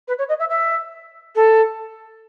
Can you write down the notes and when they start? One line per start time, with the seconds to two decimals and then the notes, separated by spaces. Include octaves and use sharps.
0.08 B4
0.19 C#5
0.29 D#5
0.39 E5
0.50 E5
1.35 A4